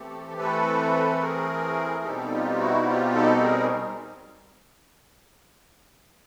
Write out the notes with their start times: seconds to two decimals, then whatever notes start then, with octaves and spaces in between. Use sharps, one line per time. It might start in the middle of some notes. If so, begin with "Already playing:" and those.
Already playing: E3 A3 C4 G4 A4
0.37 E3 A3 C4 A4 B4
1.21 G#4 A#4
2.04 B2 G3 C4 D#4 G4 A4
2.31 F4 G4
2.59 E4 F#4
2.87 F4 G4
3.15 G4 A4
3.42 G#4 A#4